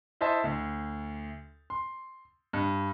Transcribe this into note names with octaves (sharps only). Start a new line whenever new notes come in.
E4 C5 D#5 E5 A5
D2
C6
G2